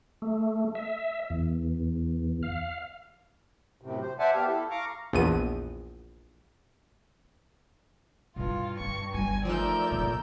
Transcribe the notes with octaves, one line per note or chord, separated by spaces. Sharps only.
A3
E5
E2
F5
F#2 A2 C3
C5
C5 D5 E5 F#5 G#5 A5
B3 G4 F5
E4 A4
F5 A#5 C#6 D6
A#1 E2 D#7
G2 B2 E4 F4
C#4 C#6
G1 G3 G#5
F3 A3 D#4 A#4 D5 E6 G6
A#1 C4